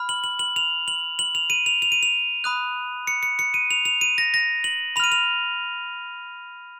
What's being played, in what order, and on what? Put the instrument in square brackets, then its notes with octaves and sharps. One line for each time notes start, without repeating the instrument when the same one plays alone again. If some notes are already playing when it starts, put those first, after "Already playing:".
Already playing: [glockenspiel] B5 F6
F#7
F#7
F#7
F7
F#7
F#7
F7
D#7
F7
F7
D#7
F7
B5 D#6 F#6
C#7
C#7
C#7
D#7
F7
F7
D#7
A#6
A#6
F#7
B5 F7
F6 D#7
F7